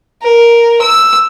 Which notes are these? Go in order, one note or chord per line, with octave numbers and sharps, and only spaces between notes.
A#4
E6